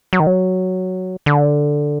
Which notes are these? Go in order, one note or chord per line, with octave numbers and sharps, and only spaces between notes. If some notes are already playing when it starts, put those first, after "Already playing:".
F#3
D#3
F#3
D3